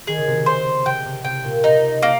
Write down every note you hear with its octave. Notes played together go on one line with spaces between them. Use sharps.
D#3 G#4
C#3
C3
C#3
C5
C3 G5
C3
C3 G5
A#2
C3 D#4
A#3